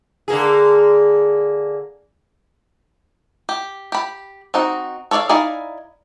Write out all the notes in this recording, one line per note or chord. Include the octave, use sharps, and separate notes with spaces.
D3 A#3 G#4
G4
G4 B5
C4 D#4 F#4
A4 C#5 D5 E5 F5
D#4 E4 D5 F5 G#5